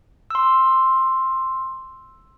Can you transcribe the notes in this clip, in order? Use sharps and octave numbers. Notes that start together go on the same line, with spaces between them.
C6 E6